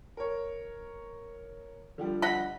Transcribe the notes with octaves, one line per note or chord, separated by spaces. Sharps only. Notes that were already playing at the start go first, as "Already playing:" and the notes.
A#4 C#5
D3 F3 G3
D#5 F#5 B5